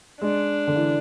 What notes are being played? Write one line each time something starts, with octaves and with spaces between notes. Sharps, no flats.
G#3 D4
D3
E3